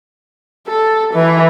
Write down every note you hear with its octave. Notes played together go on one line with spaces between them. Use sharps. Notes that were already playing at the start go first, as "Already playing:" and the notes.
A4
E3